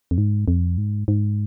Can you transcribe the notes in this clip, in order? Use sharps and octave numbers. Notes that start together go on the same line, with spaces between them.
F2
G#2
F2
G#2
G#2